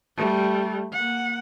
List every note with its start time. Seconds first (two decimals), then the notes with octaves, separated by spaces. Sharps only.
0.17 G3 A3
0.92 A#3 F#5